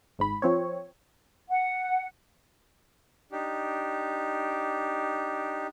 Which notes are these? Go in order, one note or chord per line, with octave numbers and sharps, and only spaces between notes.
G#1 G#2 B5
F3 C4 C#5
F#5
D4 D#4 G4